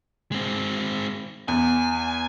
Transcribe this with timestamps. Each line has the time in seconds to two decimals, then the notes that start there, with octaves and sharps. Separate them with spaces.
0.32 G#3 C4
1.48 E2 G#5